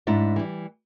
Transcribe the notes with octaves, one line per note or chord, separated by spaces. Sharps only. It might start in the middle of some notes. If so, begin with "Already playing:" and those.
G#2 D4 E4
E3 G3